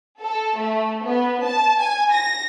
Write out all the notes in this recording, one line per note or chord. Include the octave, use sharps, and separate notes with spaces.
A4
A3
B3
A5
G#5
A#6